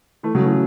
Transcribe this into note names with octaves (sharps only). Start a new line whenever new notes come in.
E3 A3
C#3 F#3
E3